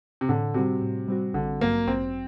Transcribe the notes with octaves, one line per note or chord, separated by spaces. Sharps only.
C3
A2 D3
C3 G3 C4 F#4
A2
G3 C4 F#4
A1 D3
G2 F#3 A#3
A1 C4